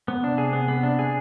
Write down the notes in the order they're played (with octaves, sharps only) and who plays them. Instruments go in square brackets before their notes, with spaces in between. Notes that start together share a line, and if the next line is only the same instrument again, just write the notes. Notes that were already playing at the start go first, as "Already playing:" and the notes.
[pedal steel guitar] B3
[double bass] C3 [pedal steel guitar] D4
[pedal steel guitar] G#4
B3
B3
D4
G#4